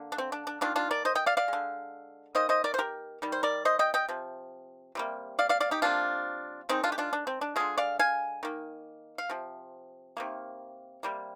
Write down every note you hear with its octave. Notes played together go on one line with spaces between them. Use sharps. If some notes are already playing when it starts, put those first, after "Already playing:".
Already playing: D3 A#3
D4
C4
D4
D4
D#3 A#3 D4 F4
D4 F4
A#4 D5
C5 D#5
D#5 G5
D5 F5
D5 F5
D3 G#3
D#3 A#3 C5 D#5
C5 D#5
A#4 D5
C5
G4 A#4
D#3 G3
C5
A#4 D5
C5 D#5
D#5 G5
D#5 G5
C3 F3
C3 G3 A#3
D5 F5
D5 F5
D5 F5
D#4 G4
C3 F3 A#3 D4 F4
D#3 G#3 C4 D#4
D4 F4
G4
D4 F4
D4
C4
D4
D3 G#3 F4 G#4
D5 F5
F5 G#5
D#3 A#3
F5
C3 F3
C3 D#3 A#3
C3 G3 A#3